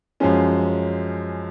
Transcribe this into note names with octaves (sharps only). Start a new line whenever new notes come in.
F#2 F3 G#3 C#4